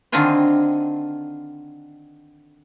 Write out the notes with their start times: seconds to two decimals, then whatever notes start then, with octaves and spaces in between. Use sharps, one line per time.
0.12 D3 D#3 C4 F4 G#5 C6